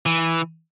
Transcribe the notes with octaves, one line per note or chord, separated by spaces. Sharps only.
E3